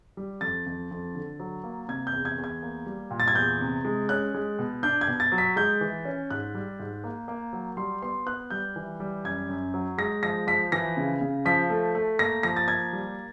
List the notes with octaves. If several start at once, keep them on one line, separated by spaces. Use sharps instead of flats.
G3
F2 A6
F2
F2
D3
F#3
A#3
C3 G#6
G6
E2
G#6
E2
G#6
A#3
G3
A#2
A6
G#6
E2 G6
C3
G#3
C#4 F#6
G#3
B2
D4 G6
G#6
B2
A6
F#3
B6
G#3 G6
E3
C#4
G#2 F#6
G3
G#2
A#3
A#3
F#3
G3 C6
B3 C6
B3 F#6
G3 G6
E3
G3
F#2 G#6
F#2
F#3
G#3 A#6
F3 A#6
F3 B6
E3 A#6
C#3
C#3
F3 B6
A3
A3
A#3 A#6
F3 A#6
A6
A#3 G#6
G3